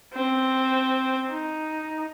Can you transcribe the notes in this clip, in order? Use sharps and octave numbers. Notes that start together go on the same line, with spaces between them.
C4
D#4